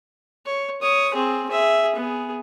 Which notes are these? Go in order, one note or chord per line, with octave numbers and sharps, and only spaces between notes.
C#5
C#5 D#6
C4 G#4
G#4 E5
B3 G#4